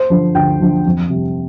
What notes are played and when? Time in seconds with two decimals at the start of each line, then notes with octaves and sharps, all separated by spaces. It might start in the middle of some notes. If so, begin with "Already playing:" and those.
Already playing: C5
0.10 D3 F3
0.35 D2 G5
0.61 D3 F3
0.86 F2
1.10 C3 G3